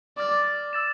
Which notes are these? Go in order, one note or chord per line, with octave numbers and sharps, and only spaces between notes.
D5 D6 F6 A6
E6 A6 E7